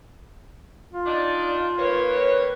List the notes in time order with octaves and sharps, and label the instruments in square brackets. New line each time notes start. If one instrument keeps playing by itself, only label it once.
[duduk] F4
[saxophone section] D4 D#4 [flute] D5
[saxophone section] D#3 A#3 C#5 [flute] B4